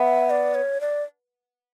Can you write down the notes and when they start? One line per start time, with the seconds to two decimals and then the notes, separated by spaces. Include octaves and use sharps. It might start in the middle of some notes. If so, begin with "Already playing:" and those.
Already playing: B3 E5
0.30 D5
0.55 C#5
0.81 D5